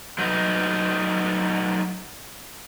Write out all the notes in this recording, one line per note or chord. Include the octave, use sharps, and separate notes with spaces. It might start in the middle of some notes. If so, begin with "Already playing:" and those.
F#3 A3 D#4 B4